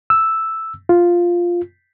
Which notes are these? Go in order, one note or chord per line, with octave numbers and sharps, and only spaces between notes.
E6
F4